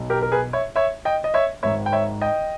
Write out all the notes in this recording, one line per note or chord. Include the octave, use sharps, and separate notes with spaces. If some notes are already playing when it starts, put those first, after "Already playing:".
Already playing: B1 B2
G4 A#4
A#4
G#4 B4
C#5 E5
C#5 E5
D#5 G5
D#5
C#5 E5
G#1 G#2 D#3 C#5 E5
G5
C#5 E5
D#5 G5